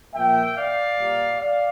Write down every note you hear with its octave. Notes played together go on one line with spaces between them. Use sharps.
A#2 F3 A#3 E5 G5
D5 F5
A#2 G3 A#3
D5 F5